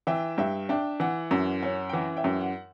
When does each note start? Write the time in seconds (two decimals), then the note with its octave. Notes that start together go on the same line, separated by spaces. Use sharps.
0.07 E3 E5 G5
0.38 G2 E5 G5
0.69 D4 E5 G5
1.00 E3 F#5
1.31 F#2
1.63 C#4
1.89 G5
1.93 E3 F#5
2.17 E5 G5
2.24 F#2
2.41 F#5